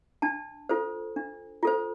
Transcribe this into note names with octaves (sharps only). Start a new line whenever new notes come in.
D4 A5
F4 A4 C5
D4
F4 A4 C5